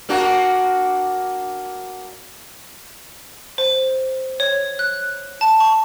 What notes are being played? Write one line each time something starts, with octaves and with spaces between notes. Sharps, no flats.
A#3 D4 F#4
C5
C#5
F#6
A5
C#6